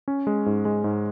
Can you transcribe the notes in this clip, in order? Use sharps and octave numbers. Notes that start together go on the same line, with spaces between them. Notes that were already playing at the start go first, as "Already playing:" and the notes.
C#4
G#3
G#2
G#3
G#2